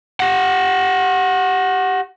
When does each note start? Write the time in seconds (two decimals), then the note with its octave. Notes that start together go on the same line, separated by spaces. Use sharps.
0.20 G4 F#5